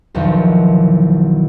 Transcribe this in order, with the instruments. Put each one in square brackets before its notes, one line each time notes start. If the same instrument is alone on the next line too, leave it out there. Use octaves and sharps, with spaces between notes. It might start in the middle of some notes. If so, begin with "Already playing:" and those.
[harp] B1 E2 D#3 F3